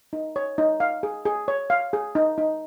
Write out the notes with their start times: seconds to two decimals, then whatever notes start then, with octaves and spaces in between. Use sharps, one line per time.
0.13 D#4
0.36 C#5
0.58 D#4
0.80 F5
1.03 G#4
1.25 G#4
1.48 C#5
1.70 F5
1.93 G#4
2.15 D#4
2.38 D#4